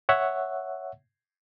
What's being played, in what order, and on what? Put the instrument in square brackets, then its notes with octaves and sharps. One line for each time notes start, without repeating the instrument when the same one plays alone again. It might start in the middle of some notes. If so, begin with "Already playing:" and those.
[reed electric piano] C#5 E5 F#5